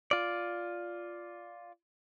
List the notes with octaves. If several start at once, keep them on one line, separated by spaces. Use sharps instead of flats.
F4 D5